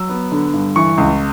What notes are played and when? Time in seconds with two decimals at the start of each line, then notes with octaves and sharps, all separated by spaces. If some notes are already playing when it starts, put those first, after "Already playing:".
Already playing: F#3 E6
0.09 B3
0.32 D3
0.54 G2
0.76 E3 C#6
0.98 C#2